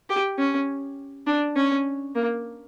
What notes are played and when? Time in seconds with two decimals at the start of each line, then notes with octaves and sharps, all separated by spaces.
0.10 G4
0.38 C#4
1.27 D4
1.56 C#4
2.15 A#3